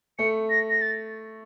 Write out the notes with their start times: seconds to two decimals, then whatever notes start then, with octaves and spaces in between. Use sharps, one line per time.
0.19 A3 C#7
0.50 A#6
0.70 A#6
0.81 A6